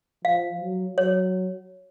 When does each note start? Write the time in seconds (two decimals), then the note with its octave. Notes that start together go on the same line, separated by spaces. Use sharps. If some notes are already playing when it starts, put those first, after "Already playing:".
0.25 F3 F5
0.61 F#3
0.98 F#3 C#5